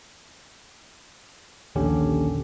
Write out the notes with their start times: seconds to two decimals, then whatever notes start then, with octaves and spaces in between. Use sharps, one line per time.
1.75 A#1 D#2 D3 C#4 G4